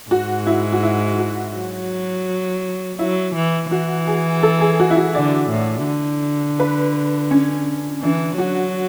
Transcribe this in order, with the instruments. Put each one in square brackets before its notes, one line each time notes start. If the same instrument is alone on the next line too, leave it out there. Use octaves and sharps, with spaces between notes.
[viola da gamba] G#2 [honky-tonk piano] F#4
[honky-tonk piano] E4
F#4
E4
F#4
[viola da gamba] F#3
[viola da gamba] F#3 [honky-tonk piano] E4
[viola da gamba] E3
[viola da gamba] E3 [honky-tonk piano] F#4
[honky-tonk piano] G#4
A4
G#4
F#4
E4
F#4
[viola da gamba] D3 [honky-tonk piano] D5
[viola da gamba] A2
D3
[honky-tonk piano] B4
C#4
[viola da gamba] E3 [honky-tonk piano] D4
[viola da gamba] F#3 [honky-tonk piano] F#4